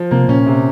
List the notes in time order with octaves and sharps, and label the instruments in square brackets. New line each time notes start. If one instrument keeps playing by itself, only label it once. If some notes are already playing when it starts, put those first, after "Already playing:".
Already playing: [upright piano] F3
[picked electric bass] C3 [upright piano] A#3
[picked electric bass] A#2 [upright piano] C#4
[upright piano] C3